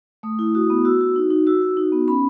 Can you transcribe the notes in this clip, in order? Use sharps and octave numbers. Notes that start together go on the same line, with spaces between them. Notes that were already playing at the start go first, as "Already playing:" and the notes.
A3 D#6
E4
F#4 D#6
B3
F#4 E6
F#4
D#4
D#4
F#4 E6
F#4
D#4
B3
C#4 B5